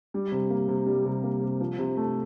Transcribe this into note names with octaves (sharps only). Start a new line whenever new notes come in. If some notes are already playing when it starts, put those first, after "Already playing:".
G3
C3
A#3
C3
G3
C3
A#3
C3
F3
C3
A3